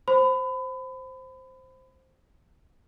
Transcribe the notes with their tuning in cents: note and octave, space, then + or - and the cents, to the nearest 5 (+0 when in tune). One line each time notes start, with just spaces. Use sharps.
C5 +0 B5 +30